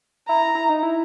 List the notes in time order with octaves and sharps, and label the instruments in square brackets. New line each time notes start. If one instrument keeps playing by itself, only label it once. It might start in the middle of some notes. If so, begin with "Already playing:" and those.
[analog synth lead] E4 [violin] A#5
[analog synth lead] E4
D#4
E4